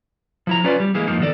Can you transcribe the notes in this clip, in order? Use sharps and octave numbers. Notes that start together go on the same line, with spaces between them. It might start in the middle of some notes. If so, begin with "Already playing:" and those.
F3 E4 A#5
C#4 F4 B4 D5
G3
E3 G#3 A#3
F2 F3 A#3 D#4
D#3 B3 F#4 A4 D5